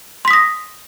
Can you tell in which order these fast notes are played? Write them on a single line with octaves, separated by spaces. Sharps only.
C6 B6 D#6 A#6